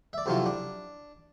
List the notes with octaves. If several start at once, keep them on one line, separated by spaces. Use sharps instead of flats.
D5 E5
F2 C3 F#3 C#4 E4 F4
D4